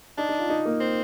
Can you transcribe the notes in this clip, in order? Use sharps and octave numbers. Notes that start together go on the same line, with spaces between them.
D4 D#4
D#4
F4
D#4
A#3
C4